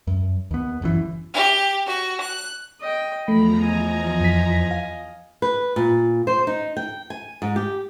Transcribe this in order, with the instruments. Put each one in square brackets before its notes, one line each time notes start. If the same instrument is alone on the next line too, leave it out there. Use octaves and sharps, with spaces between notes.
[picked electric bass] F#2
D#2 B3
G1 F#2 E3
[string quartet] G4
F#4
F#6
[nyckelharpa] D#5 G5
[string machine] E2 F3 A#5 [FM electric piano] A3 [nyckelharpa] B5
[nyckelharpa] D#5 G#5
[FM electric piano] F2 B6
F5
[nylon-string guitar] B4
A#2
C5
D#4
G5
G#5
G#2
G4